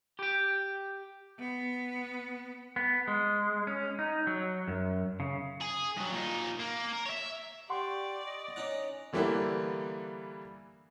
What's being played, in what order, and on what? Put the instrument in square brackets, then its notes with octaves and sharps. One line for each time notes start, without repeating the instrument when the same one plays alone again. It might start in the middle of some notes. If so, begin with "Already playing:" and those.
[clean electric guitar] G4 G5
[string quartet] B3
[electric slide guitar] B3
G#3
C#4
D#4
F#3
F#2
C#3
[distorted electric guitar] G#4
G2 F#3
A#2 D#4
A#3
A#4
C#5 E5
[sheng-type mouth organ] G4 [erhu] D5 [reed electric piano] F#5 C6 C#6
[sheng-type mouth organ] D#5
[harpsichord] C#4 D#4 F#5
[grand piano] D3 E3 G3 A#3 B3 E4